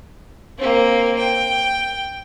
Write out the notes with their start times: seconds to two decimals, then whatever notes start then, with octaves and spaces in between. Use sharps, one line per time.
0.58 A#3 C4
1.19 G5